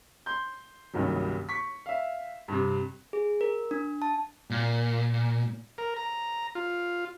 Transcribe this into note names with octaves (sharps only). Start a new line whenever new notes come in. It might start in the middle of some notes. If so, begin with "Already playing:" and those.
C6 G6
F#1 C2 G2 D#3 F#3
C#6 B6
E5 F5
G2 C3
G#4
A#4
D4
A5
A#2
A#4
A#5
F4